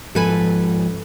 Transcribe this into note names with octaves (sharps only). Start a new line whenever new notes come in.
G#2 F3 A4 B4 G#5